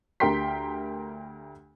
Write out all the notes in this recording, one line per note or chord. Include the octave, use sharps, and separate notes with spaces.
D2 G4 A#4 G5 C6 B6